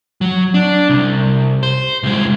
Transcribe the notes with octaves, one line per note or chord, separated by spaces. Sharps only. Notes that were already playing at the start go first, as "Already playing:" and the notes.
F#3
D4
C2
C5
C2 G#3